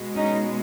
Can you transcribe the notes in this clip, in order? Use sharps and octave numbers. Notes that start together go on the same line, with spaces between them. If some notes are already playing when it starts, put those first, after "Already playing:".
Already playing: B2 G#3
C#4 D#4